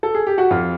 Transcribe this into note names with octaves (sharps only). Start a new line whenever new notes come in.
A4
G#4
G4
F#4
F2 F4